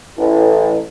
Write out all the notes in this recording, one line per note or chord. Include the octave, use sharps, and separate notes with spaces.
A1